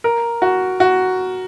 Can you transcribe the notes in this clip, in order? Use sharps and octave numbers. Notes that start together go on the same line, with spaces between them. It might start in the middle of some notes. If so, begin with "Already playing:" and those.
A#4
F#4
F#4